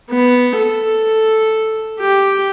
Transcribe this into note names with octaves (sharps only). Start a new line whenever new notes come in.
B3
A4
G4